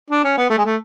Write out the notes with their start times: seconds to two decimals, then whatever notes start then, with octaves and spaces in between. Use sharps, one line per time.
0.10 D4
0.24 C#4
0.37 B3
0.50 A3
0.58 G#3
0.65 A3